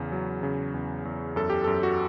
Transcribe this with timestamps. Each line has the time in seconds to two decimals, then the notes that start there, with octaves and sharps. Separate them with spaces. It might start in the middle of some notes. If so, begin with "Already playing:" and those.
Already playing: E2 C#3
0.12 F#3
0.43 C#3
0.74 E2
1.05 E2
1.36 F#2 A4
1.50 G4
1.64 A4
1.67 F#2
1.83 F#4